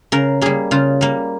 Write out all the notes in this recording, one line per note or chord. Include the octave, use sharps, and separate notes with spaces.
C#3 A#4
G3 A#3 G#4
C#3 F4
G3 A#3